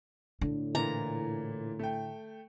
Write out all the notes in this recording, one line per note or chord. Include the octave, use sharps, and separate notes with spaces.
A2 D3
A#2 E3 A#5
A3 G5